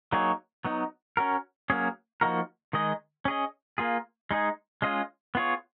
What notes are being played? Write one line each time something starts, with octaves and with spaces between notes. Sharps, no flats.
F#3 A#3 D#4 G#4 C#5
F#3 B3 D#4
C#4 F#4 A#4
F#3 A#3 C#4 G#4
F3 A#3 D#4 F#4 A#4
D#3 G#3 D#4 G#4 D#5
C#4 G#4 D#5
A#3 F4 G#4
G#3 D#4 G#4
G#3 C#4 F4 G#4 D#5
B3 F4 G#4 C#5